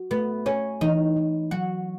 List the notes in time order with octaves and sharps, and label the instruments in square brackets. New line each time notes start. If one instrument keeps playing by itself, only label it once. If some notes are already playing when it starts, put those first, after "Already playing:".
Already playing: [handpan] F#4
[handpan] A3 [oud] B3
[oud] C#4 [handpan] C#5
[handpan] E3 [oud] D#4
[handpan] E3
[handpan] F#3 [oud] F#4